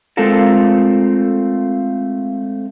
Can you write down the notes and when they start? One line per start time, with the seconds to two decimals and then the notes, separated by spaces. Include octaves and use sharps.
0.17 G#3 A3 C4 F4 A4 A#4